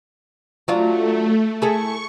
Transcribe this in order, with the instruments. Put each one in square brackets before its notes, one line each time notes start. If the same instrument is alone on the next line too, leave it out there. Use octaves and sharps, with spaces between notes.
[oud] F#3 D4 F4 [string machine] A3
[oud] E4 G#4 A4 [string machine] C#6